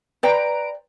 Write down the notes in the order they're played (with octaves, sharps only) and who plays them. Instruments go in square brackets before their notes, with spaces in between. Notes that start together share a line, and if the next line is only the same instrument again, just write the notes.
[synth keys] B4 A#5 D7 [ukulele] C5 D5 G5